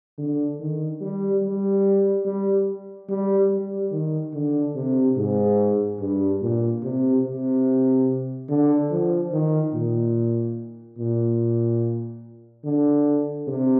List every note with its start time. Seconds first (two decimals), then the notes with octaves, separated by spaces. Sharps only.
0.18 D3
0.60 D#3
1.01 G3
1.43 G3
2.25 G3
3.09 G3
3.50 G3
3.92 D#3
4.34 D3
4.75 C3
5.17 G#2
6.00 G2
6.41 A#2
6.83 C3
7.24 C3
8.49 D3
8.91 F3
9.32 D#3
9.74 A#2
10.98 A#2
12.65 D3
13.48 C3